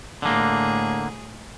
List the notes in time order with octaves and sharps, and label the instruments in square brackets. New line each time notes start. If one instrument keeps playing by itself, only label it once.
[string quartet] A2 G#4 [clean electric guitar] D3 A#3